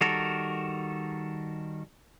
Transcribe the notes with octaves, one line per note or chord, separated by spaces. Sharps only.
D#3 G3 F#4 A4 A#4